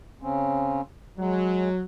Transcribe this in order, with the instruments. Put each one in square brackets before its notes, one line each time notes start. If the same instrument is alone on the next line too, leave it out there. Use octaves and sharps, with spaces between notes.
[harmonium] C#3 C4 C#4
[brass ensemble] F#3 [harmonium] G#3